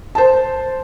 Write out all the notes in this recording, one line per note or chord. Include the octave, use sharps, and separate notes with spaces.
C5 A5